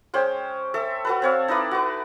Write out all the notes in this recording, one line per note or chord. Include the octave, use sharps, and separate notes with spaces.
G#3 C#4 C5 G5
A4 E5
F#4 A4 B4
C4 C#5 F5
D#4 E4 B4 D5
F#4 B4